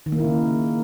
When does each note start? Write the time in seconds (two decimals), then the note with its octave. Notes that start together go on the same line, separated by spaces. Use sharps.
0.06 D#3
0.12 A#3
0.18 E4
0.24 C#3